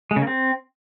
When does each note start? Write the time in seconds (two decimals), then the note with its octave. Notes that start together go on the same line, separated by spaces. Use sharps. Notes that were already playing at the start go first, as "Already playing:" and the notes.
0.11 G#3
0.16 C#3
0.22 A#3
0.27 C4